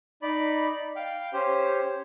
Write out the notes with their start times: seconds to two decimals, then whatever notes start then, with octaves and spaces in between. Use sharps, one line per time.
0.22 D#4 D5 B5
0.96 F5 G5
1.33 C#4 G4 C5